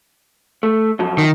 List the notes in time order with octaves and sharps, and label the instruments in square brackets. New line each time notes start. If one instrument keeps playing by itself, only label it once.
[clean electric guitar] A3
F#2 F3
[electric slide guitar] D#3